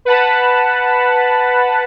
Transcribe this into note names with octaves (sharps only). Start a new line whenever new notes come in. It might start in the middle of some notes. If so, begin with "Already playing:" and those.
B4 F#5 A5 B5